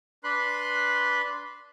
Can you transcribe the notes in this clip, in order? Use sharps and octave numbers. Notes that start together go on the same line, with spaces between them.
D4 B4 B5 C6 F#6